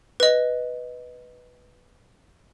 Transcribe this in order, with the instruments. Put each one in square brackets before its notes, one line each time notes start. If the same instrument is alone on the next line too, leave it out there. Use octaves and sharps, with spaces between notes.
[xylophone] B4 D#5